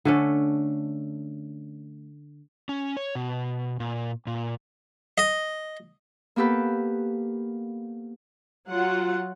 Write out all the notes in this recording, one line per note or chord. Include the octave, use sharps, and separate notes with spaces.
D3 A3 C#4
C#4
C#5
B2
A#2
A#2
D#5
A#3 B3 G4 A4 B4
F#3 F4 F#5